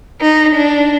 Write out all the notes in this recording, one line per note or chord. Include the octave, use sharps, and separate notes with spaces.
D#4
D4